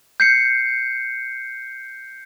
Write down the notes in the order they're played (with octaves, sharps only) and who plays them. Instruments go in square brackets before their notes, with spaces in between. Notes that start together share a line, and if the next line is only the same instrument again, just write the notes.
[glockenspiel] G6 C7 C#7